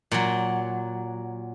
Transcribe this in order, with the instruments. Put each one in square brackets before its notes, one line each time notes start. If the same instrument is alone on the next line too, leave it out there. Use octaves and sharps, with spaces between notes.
[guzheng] A#2 F#3